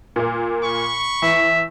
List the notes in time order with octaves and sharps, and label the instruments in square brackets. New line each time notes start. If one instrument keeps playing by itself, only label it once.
[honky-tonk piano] A#2 A#3
[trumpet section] B5 C#6
[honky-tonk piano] E2 [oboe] E5